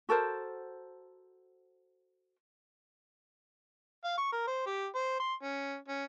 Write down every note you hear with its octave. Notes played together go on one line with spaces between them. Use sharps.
F#4 A4 A#4 C5
F5
C#6
A#4
C5
G4
C5
C6
C#4
C#4